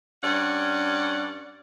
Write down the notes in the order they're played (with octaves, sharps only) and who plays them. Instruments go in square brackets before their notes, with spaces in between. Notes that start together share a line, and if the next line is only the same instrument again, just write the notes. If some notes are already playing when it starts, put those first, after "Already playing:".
[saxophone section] G2 C#4 D5 F#5